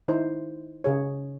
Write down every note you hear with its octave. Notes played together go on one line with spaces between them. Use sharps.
D#3 D#4 E4 C5
C#3 G#4 C#5